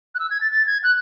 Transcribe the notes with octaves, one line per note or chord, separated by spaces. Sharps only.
F#6
E6
G#6
A6
A6
G#6
F#6